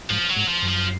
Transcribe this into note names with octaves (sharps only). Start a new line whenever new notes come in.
G#2 F3
F#3
G#2
F3
F#2
F3